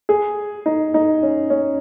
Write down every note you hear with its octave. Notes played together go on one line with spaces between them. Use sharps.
G#4
D#4
D#4
C#4
C#4